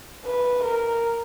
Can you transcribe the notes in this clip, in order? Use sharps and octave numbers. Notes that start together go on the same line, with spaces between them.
B4
A#4